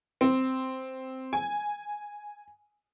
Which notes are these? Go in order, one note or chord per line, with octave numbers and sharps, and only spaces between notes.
C4
G#5